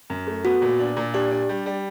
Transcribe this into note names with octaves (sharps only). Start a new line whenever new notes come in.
F#2
A3
B3 F#4
A#2
D4
A#2
D4 G4
D4
G3
G3